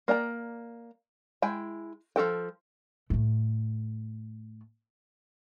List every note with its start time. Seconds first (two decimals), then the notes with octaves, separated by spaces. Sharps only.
0.08 A#3 D5 G5 A#5
1.42 G#3 E4 G5 G#5
2.16 F3 F#4 A4 G5
3.10 A2 A3